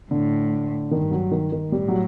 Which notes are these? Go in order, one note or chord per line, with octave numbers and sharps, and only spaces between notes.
A2 D3
G2 D#3
F#3
D#3
D#3
A2 G3
F#3